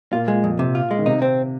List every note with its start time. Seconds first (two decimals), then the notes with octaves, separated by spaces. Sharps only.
0.12 A#2 F4
0.28 G#3
0.44 F2
0.59 C3
0.75 F4
0.91 G#3
0.99 D#3
1.06 C3 D#4
1.22 C4